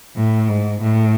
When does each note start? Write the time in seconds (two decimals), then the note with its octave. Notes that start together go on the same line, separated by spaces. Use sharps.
0.16 A2
0.49 G#2
0.82 A2